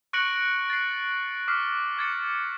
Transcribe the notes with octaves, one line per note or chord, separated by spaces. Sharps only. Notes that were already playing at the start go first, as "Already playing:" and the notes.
C#6 F#6 A#6 C#7 D7 F#7
A6 C7
D6 F6 B6 C7
D6 G#6 A6 C#7